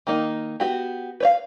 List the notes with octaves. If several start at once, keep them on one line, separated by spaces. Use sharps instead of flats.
D#3 A#3 D#4
B3 F#4 G4
B4 C#5 F5